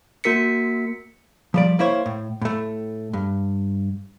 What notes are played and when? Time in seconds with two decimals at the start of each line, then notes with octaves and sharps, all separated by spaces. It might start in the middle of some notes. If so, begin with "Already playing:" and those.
0.24 A#3 F#4 A#4 B6 C#7
1.54 F3 G3 D5
1.79 A#3 E4 C5 C#5
2.06 A2
2.41 A2 A3
3.13 G2